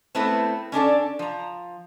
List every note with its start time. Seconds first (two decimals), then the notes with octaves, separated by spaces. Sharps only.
0.15 A3 B3 C4 E4 A4 B4
0.72 C#4 D4 A4 D5
1.19 F3 A#5